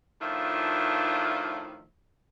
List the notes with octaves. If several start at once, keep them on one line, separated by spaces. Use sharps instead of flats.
A2 D#3 F3 D4 F4 E5